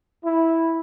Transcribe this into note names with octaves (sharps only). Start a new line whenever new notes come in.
E4